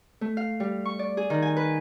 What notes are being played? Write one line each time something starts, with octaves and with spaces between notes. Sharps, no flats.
A3
F5
G3
C#6
D5
G#4
D#3
G#5
B4